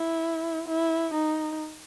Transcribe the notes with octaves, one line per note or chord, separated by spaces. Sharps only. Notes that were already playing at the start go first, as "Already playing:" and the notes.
Already playing: E4
E4
D#4